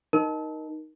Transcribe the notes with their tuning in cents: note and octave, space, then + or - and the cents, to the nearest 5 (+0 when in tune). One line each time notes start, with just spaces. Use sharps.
D#4 +0 A#4 +15